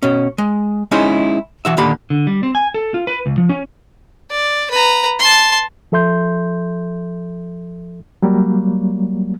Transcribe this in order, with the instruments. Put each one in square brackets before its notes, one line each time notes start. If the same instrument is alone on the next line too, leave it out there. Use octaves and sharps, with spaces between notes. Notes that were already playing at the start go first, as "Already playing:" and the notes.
[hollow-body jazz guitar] B2 C#4
G#3
G#3 C#4 D#4 E4 G#4 C5
E3 F#4 E5
D#2 A#2 D3 G4 B5
[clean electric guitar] D3
G3
C4
G#5
A4
F4
B4
C#2
F3
C#4
[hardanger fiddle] D5
B4 A#5
A5 C6
[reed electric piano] F3 A4 E5 C6 G6
F#3 G3 A#3